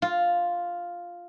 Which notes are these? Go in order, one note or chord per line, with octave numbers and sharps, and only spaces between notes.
F4